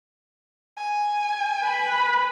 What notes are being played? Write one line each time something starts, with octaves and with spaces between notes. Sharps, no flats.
G#5
B4 B5